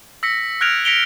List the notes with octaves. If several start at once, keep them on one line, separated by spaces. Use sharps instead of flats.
E6 A#6 B6 C#7
F6 F#6 G#6 A#6 D7 F7
A#6 B6 C#7 D7 F7 G7